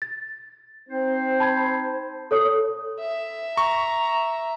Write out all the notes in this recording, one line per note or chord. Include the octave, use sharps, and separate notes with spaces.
A6
C4 D#4 C5
A5 B5 G#6
A4 C#5 D#6
E5
A#5 C#6